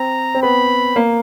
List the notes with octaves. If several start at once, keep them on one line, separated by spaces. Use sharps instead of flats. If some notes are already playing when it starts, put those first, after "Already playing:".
Already playing: C4 A#5
C4
B3 B5
A#3